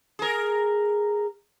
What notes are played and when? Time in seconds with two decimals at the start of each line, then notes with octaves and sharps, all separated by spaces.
0.19 G#4 A#4